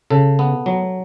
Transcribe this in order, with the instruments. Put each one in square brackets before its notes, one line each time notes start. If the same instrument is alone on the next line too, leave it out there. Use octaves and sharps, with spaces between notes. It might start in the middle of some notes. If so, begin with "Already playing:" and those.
[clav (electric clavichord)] C#3 A4
B3
F#3